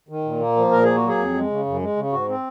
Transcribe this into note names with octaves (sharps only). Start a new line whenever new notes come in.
D#3
A#2
A#3
F3
A#2 A#4
A#3 G#4
F#4
F#3
G#4
F2
G#3
C#3
F#2
G#3
C#3
G#2 F#4
C4